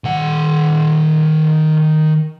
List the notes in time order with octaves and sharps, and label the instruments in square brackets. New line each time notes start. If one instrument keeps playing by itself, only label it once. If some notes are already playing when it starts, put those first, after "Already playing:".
[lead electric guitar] D#3 F#5